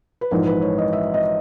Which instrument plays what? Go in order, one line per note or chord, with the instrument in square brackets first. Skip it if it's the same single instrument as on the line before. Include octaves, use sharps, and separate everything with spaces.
[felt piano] B4
A#1 G#2 E3 A#4
B4
C#5
D#5
E5
D#5